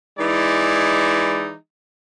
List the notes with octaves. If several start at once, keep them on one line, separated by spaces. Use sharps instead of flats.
E3 G#3 D#4 E4 D5